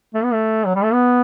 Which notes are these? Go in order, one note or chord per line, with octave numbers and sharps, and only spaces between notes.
A3
B3
A3
F#3
G3
A3
B3